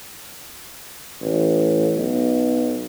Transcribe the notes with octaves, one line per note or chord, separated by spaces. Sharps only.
A1
B1